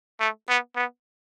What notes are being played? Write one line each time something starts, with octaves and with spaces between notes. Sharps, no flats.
A3
B3
B3